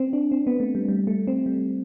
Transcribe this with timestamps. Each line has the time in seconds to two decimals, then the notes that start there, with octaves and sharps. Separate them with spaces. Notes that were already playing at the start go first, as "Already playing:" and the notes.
Already playing: C4
0.13 D4
0.32 C4
0.47 B3
0.60 A3
0.75 G3
0.88 G3
1.07 A3
1.27 C4
1.46 G3